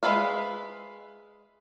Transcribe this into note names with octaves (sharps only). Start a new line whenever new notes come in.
G#3 D4 B4 E5 F5